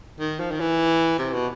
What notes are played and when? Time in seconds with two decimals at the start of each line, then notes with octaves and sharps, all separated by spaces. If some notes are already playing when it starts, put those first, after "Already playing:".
0.20 D#3
0.40 F3
0.51 D#3
0.60 E3
1.19 C3
1.33 B2